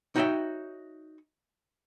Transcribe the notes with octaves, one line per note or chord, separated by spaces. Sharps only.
D#4 F#4 C#5 D#5 E5 G5